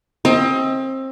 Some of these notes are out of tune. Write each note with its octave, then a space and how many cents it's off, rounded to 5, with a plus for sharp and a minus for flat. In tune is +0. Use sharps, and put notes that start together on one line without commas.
C4 +25 D#5 +30